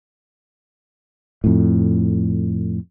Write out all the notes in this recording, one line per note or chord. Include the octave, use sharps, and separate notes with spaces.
F2 A2